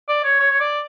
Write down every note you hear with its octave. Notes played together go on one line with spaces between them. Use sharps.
D5
C#5
C#5
C#5
D5